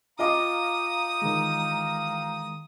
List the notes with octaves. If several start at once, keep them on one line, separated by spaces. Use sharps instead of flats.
F4 D#5 F5 G5 A#5 D6 D#6
D#3 E3 G#3